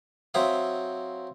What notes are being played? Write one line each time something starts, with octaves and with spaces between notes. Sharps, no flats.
F#3 C4 C5 E5 F5 D#6